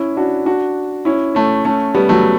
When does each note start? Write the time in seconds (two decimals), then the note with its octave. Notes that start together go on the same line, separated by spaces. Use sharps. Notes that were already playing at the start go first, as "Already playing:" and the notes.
Already playing: C#4 E4
0.17 D4 F#4
0.46 D4 F#4
1.05 C#4 E4
1.35 A3 C#4
1.65 A3 C#4
1.95 G3 B3
2.09 F#3 A3